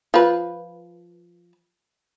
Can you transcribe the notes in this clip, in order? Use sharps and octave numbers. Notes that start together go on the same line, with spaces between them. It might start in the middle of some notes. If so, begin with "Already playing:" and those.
F3 B4